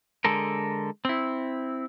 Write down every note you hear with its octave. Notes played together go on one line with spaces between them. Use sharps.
D3 G#3 A4 A#4
C4 E4